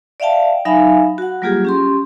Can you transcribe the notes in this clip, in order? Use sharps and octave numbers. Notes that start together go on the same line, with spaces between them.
D5 E5 F5 G5 A5
F#3 D#4 E5 F5 G#5 B5
F#4 F#5
F#3 G3 A#3 F4 G4 G#4
C#4 G4 C6